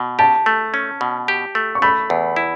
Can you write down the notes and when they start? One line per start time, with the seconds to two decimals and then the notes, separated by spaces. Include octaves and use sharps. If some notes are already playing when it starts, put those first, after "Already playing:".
Already playing: B2
0.19 G4 A5
0.46 A3
0.74 C#4
1.01 B2
1.28 G4
1.55 A3
1.75 C#6
1.82 A3 B5
2.10 E2
2.36 E4